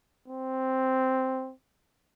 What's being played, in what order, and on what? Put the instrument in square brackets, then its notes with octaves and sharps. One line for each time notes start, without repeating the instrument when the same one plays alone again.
[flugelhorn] C4